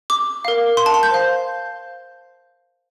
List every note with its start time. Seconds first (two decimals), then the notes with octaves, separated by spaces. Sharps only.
0.10 D6
0.45 A#4 F5
0.77 C6
0.86 A5
0.94 C6
1.03 G6
1.11 C5 F5